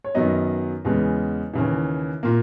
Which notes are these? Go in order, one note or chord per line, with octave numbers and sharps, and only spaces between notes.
C#5
F#2 D#3 F#3 B3 D#5
E2 C#3 G#3 B3
D#2 C#3 E3
A#2 A#3